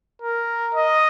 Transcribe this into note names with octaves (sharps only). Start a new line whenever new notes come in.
A#4
D#5